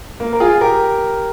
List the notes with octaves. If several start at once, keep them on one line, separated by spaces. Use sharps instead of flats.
A#3
A#4
F4 G#4
G4 A#4